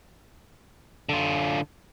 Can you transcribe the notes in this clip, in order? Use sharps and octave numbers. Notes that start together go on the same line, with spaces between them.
D3 F4